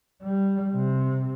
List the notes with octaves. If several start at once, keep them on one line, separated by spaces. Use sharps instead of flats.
G3
C3